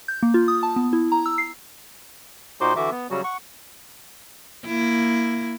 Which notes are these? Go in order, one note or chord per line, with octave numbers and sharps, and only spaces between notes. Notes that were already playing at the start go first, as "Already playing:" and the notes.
G6
A#3
F4
D#6
A5
B3
E4
A#5
E6
C7
A#2 D#4 F#4 C5 C6 D6
D3 E3 F#4 E5 D6
B3
C#3 F#3 G3 F#4
F#5 C#6
A#3 E4